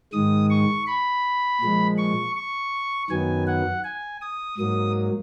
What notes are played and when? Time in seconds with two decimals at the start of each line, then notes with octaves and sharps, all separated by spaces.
0.12 G#2 D#3 G#3 D#6
0.50 C#6
0.87 B5
1.61 A#2 F3 G#3
1.98 C#6
2.36 C#6
3.10 F#2 D#3 F#3 B3 G#5
3.47 F#5
3.84 G#5
4.21 D#6
4.58 G#2 F#3 A#3 D#6